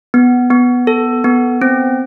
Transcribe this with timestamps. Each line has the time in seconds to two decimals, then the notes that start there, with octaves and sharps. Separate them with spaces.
0.14 B3
0.50 B3
0.87 A4
1.24 B3
1.61 C4